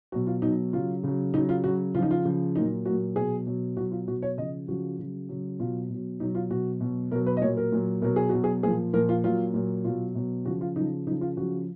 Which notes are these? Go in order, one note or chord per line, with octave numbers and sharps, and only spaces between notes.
B2 F#3 F#4
F4
B2 F#3 D#4
C#3 F#3 F4
C#3 F#3
C#3 F#3 D#4
F4
C#3 F#3 F#4
C#3 F3 D#4 F4
F4
C#3 F3
A#2 F#3 D#4
F#3 F#4
A#2
B2 F#3 G#4
B2 F#3
B2 F#3 F#4
F4
B2 F#3 F#4
C#5
C#3 F3 D#5
C#3 F3 F#4
C#3 F#3
C#3 F#3
B2 F#3 F4
B2 F#3
B2 F#3 D#4
F4
B2 F#3 F#4
B2 F#3
B2 F#3 A#4
B4
D#5
A#2 F#3 C#5
A#4
A#2 F#3
B2 F#3 A#4
G#4
B2 F#3 F#4
G#4
A#2 F3 G#4
A#2 F3 A#4
F4
A#2 F#3 F4
A#2 F#3
B2 F#3 F4
B2 F#3
C#3 F3 F#4
F4
C#3 F3 D#4
C#3 F3 D#4
F4
C#3 F3 F#4